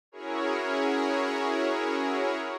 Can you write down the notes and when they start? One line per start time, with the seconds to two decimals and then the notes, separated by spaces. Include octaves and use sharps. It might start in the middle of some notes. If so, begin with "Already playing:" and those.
0.12 C#4 E4 F#4 G#4 A#4 C#5